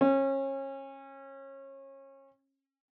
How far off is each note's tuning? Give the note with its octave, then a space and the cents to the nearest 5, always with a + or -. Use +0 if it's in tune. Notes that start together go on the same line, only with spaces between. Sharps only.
C#4 -30